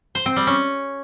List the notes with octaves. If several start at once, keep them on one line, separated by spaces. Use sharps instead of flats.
C5
C4
G3
C#4